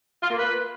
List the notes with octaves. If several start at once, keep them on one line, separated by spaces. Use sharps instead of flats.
F4
A#3
B4